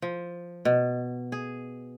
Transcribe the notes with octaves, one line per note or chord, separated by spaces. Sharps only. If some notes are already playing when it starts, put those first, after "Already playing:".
F3
B2
G#4